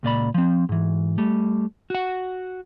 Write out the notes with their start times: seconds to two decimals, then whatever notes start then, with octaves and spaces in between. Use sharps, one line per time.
0.03 C#2 A#2 D5 B5
0.34 F3 C4
0.69 G#2 E3
1.18 G3 A3
1.90 F#4 F#5